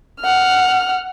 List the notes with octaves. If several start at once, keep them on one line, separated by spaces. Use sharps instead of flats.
F#5 F6